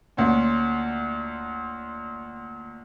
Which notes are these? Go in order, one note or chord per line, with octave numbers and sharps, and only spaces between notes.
D2 A#2 C#4